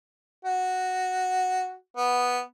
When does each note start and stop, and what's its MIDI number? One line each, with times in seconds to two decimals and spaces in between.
0.45 1.73 66
1.97 2.40 59